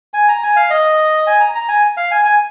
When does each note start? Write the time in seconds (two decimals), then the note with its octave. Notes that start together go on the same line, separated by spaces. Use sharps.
0.14 G#5
0.29 A#5
0.43 G#5
0.56 F5
0.70 D#5
1.27 G#5
1.40 A#5
1.55 A#5
1.69 G#5
1.97 F5
2.11 G#5
2.25 G#5